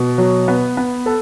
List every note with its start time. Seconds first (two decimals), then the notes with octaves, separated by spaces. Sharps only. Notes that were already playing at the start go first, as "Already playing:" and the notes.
Already playing: B2
0.18 F#3
0.48 B3
0.77 B3
1.06 A4